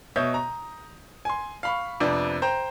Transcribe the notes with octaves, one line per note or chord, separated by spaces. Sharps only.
B2 C#5 D#5 E5 D#6 G6
A#5
G#5 C6
F5 B5 C#6
F2 C3 B3 D4
C5 G5 A#5